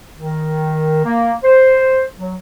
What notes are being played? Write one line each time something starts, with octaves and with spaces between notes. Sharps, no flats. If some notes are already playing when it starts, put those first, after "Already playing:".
D#3
A#3
C5
F#3